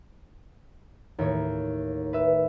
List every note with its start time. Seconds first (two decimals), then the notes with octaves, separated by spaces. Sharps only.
1.18 D#2 A2 C#5
2.13 B4 E5